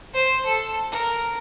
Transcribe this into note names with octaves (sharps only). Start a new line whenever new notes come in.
C5
A4
A#4